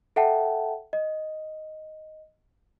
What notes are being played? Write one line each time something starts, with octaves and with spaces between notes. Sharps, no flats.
A4 E5 F#5 G5 A5
D#5